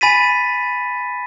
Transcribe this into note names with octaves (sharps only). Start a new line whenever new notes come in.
G#5 B5 A6 B6 D#7